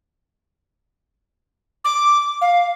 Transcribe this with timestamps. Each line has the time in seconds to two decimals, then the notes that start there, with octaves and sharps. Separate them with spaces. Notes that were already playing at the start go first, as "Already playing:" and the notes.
1.85 D6
2.41 F5